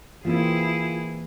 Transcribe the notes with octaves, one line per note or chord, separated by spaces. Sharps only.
E3 A#3 C4 E4 F4 G#4